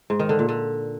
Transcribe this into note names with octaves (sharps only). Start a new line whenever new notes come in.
G#2
D#3
D3
A#2
D3